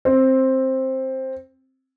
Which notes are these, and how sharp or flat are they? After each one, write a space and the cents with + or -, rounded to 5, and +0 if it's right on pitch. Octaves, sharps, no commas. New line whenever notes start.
C4 +10